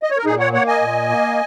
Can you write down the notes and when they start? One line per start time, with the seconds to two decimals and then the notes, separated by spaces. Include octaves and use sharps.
0.03 D#5
0.10 C#5
0.18 A#4
0.25 A#2 D#4 G#4
0.39 C#5 F#5
0.53 A#3 C#5 F#5
0.67 D#5 G#5
0.81 A#2
1.09 A#3